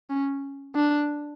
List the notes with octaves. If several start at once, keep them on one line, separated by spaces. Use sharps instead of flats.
C#4
D4